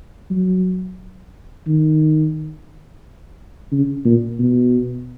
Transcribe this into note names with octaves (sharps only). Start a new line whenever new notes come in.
F#3
D#3
C#3
A#2
B2